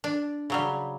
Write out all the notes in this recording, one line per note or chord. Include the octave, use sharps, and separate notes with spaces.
D4
C#3 F#3 G3